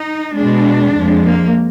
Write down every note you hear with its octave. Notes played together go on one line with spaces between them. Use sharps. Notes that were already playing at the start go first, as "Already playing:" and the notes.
Already playing: D#4
B2 G#3 D4
F2 F3 G#3
A#3